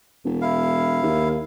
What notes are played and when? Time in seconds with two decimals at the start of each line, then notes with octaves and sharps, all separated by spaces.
0.24 E1
0.42 E4 F5
1.03 D#2